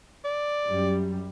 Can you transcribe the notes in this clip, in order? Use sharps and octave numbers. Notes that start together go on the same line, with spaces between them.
D5
F#2 G3